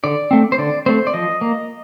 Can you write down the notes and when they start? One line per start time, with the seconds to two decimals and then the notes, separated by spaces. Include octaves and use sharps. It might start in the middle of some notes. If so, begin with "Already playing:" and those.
0.04 D3 D5
0.31 A3 C4
0.52 C5
0.58 D3 D5
0.86 A3 C4 C5
1.07 D5
1.14 F3 D#5
1.41 A#3